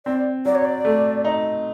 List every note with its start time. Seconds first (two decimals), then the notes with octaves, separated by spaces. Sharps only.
0.06 C4 D5
0.45 F#3 D5
0.55 C#5
0.64 D5
0.85 A3
1.24 D#4